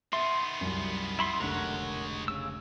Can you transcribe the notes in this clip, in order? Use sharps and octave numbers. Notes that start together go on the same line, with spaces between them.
D#3 B3 E5 C6 A6
C2 F#2
E4 B5 C6
F1 B1 D3 G#3 A#4 C#5 F#5
C#3 E6